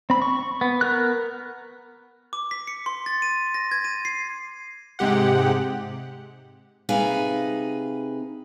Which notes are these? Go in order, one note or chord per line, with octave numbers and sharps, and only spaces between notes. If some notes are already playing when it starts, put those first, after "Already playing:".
C4 B5
C#6
B3
B3 A#4 F#6
D6
B6
C#7
C6
A6
D#7
A#6
G#6
D#7
C7
G#2 C3 G#3 G4 F#5
C3 D#4 G#4 B4 F5 G#5